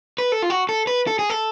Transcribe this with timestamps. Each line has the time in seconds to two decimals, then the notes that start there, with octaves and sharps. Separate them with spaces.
0.18 B4
0.32 A4
0.43 F4
0.50 F#4
0.69 A4
0.87 B4
1.07 A4
1.19 G#4
1.30 A4